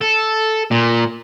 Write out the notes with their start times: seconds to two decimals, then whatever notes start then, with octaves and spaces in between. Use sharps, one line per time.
0.01 A4
0.71 A#2